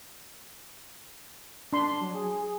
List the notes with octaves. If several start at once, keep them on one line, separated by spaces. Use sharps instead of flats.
D4 C6
F#3
G#4
G#4